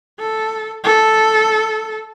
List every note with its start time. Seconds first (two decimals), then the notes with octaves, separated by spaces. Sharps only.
0.19 A4
0.84 A4